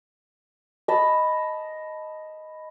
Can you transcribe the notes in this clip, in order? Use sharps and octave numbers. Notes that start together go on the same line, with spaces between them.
D#5 A5 B5